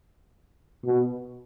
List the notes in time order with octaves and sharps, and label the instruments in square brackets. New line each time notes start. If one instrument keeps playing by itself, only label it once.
[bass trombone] B2